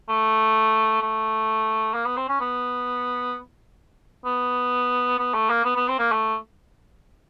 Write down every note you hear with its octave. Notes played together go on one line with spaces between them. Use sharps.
A3
A3
A#3
B3
C4
C#4
B3
B3
B3
A3
A#3
B3
B3
C4
A#3
A3